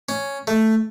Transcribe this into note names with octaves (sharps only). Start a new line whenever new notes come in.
C#4
A3